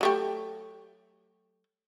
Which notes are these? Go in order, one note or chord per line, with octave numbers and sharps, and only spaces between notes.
F#3 A3 G4